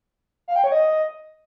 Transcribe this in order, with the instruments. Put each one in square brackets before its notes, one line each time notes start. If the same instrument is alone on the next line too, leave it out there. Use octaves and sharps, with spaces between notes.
[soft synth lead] F5
G5
C#5
D#5